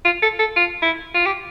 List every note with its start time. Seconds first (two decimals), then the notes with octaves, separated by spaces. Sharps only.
0.05 F4
0.22 A4
0.39 A4
0.56 F4
0.82 E4
1.14 F4
1.26 G4